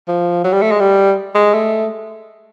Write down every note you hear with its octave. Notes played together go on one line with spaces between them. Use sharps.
F3
F#3
G3
A3
G#3
G3
G#3
A3